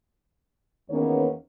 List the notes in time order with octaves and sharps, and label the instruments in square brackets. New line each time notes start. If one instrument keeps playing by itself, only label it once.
[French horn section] E2 D#3 A#3 B3 C#4 C#5